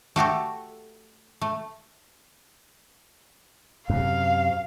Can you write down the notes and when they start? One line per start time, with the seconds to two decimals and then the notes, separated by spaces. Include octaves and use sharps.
0.16 A3 F#4 G4 A4
1.41 A3
3.90 F#2 C3 F5